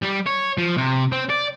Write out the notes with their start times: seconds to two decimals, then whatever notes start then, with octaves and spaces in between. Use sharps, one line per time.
0.02 G3
0.26 C#5
0.58 F3
0.77 C3
1.12 C4
1.30 D5